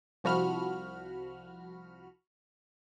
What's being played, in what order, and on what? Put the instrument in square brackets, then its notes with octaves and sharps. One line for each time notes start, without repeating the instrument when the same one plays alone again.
[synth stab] C2 F3 F#4 B5 F6